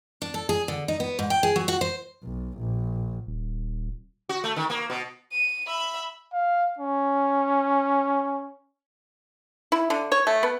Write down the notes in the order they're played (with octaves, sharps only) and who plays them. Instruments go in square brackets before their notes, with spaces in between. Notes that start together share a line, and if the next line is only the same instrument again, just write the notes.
[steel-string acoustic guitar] D4
A4
G#4
D3
D#4
B3
G#2
G5
G#4
F#3
F#4
C5
[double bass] B1
A#1
[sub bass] D#1
[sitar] F#4
A3
D#3
A#3
B2
[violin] D#7
E5 B5
[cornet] F5
C#4
[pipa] E4
D3
C#5
A3
B3